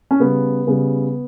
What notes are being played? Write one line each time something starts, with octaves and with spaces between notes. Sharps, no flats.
C#4
C#3 G3 B3
C#3 G3 B3